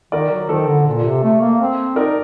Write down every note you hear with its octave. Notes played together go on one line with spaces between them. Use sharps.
D#3 A#4 D5
F#3
D#3 A4 C5
D3
A#2
C3
A3
A#3
C4
D#4 A#4 D5